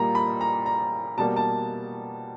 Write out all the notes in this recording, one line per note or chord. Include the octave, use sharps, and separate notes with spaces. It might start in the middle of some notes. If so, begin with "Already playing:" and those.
Already playing: A#2 G3 A#3 A#5
B5
A#5
A#5
B2 G3 A#3 A5
A5